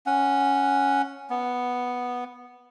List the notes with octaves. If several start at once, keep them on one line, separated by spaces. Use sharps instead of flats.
C#4 F#5
B3